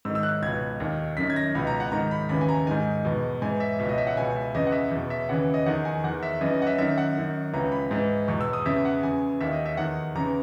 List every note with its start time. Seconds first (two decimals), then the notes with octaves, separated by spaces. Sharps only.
0.05 G#2 E6
0.10 D#3
0.15 E6
0.23 F#6
0.42 C#2 B2 G#6
0.80 D#2 D#3
1.17 F#2 D#3 B6
1.30 G#6
1.36 A#6
1.55 C#2 B2 B5
1.67 A#5
1.80 F#5
1.92 G#2 D#3 A#5
2.11 B5
2.29 D#2 C#3 E3 B5
2.41 G#5
2.49 A#5
2.67 G#2 D#3 G#5
3.05 E2 B2
3.42 G#2 E3 G#5
3.60 E5
3.79 C#2 B2 E5
3.89 D#5
3.98 E5
4.07 F#5
4.17 C#2 B2 G#5
4.36 E5
4.54 E2 C#3 E3 D#5
4.67 F#5
4.72 E5
4.91 E2 B2
5.10 E5
5.29 D#2 C#3 E3 F#5
5.54 D#5
5.66 E2 D#3 F#5
5.85 G#5
6.04 E2 D#3 F#5
6.23 E5
6.41 F#2 E3 D#5
6.54 D#5
6.62 F#5
6.67 E5
6.78 F#2 D#3 E5
6.98 F#5
7.16 F#2 D#3
7.53 C#2 C#3 E3 A#5
7.72 B5
7.91 G#2 E3
8.28 E2 B2 C#6
8.41 E6
8.53 D#6
8.66 E2 C#3 E3 E5
8.85 F#5
9.03 E2 C#3 E3 G#5
9.41 D#2 D#3 E5
9.53 D#5
9.66 E5
9.77 E2 D#3 F#5
10.15 E2 C#3 E3 A#5